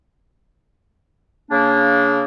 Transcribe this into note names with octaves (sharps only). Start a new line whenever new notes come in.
C#3 A#3 D4